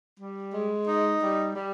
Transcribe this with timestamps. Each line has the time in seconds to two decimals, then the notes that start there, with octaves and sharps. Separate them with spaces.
0.19 G3
0.53 G#3
0.88 D#4
1.21 G3
1.56 G3